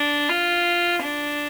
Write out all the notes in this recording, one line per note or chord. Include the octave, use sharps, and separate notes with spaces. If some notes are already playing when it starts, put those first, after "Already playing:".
Already playing: D4
F4
D4